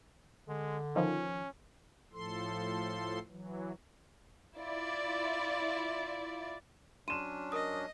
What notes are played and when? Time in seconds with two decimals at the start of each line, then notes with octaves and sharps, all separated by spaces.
0.48 D3 G#3
0.96 D#3 F3 C#4
2.13 A2 F3 A4 C6
3.29 E3 F#3
4.57 E4 F4 D5
7.08 F#3 C#4 D4 C6 D#7 E7
7.52 A#4 D#5 D#6